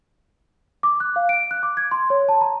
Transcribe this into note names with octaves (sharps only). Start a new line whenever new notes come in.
D6
F#6
F5
D7
F#6
D6
G#6
C6
C#5
A5
A#5